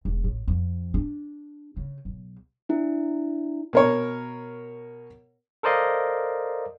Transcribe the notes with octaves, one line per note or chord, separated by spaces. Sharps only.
E1
A1
F2
D4
C#3
B1
D4 E4
B2 A#4 C#5
A4 A#4 C5 D5 D#5 F5